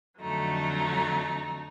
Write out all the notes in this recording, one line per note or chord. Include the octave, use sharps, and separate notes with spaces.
F2 D3 F#3 A3 D#4